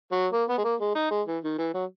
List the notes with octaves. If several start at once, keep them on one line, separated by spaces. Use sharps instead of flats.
F#3
A#3
B3
G#3
A#3
G#3
D#4
G#3
E3
D#3
E3
F#3